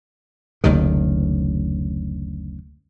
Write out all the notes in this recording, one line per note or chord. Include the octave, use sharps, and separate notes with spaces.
F#1 D2 C3 D#3